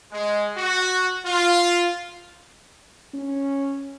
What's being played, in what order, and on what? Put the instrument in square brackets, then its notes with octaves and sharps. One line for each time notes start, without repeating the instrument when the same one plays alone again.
[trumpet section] G#3
F#4
F4
[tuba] C#4